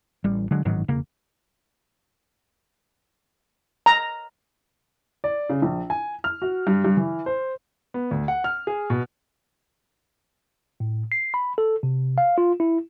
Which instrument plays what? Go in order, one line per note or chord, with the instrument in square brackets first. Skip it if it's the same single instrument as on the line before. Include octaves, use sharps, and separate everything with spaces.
[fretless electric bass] A1 G3
D3 F#3 G#3
A1 G#2 D#3 F#3
E1 C#3 A#3
[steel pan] A#5
[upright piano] D5
C#3
A#1
G#5
F6
F#4
G2
G2
E3
C5
[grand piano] B3
D2
F#5
F6
G#4
B2
[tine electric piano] A2
C7
B5
A4
C3
F5
F4
E4